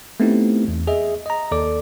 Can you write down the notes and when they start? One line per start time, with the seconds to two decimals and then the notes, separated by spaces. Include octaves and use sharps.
0.20 A3 B3 C4 D#4 E4 G4
0.68 E2
0.87 G#4 D#5 E5
1.26 D#5 A#5
1.51 D#2 A4 D5 D6